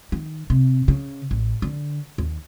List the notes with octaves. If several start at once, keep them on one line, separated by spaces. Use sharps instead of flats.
D#3
C3
C#3
A1
D3
D#2